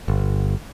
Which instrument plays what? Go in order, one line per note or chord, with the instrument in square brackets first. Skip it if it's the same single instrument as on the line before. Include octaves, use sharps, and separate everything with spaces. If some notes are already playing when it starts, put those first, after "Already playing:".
[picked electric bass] G1